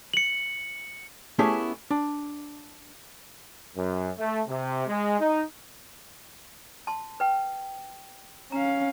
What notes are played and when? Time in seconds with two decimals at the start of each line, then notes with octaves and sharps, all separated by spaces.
0.14 C#7 F#7
1.39 A3 B3 C#4 E4 G4 G#4
1.91 D4
3.76 F#2
4.18 A3
4.48 C3
4.87 G#3
5.20 D#4
6.87 A5 C6
7.20 B4 G5
8.52 C#4 F5 A#5